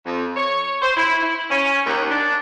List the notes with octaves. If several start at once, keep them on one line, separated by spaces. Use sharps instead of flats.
F2
C#5
C5
E4
E4
C#4
D#2
D4